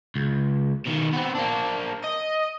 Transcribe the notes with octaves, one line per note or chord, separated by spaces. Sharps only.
C#2
B2 D#3
B3 C4
A#3 D4
D#5